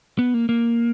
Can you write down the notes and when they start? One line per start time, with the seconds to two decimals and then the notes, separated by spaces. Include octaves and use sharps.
0.19 B3
0.34 A#3
0.49 A#3